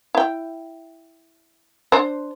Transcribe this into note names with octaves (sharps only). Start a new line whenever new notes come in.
E4 G5
D4 C5